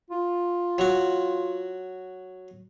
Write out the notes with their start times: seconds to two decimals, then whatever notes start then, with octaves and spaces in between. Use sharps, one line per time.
0.10 F4
0.78 F#3 F#4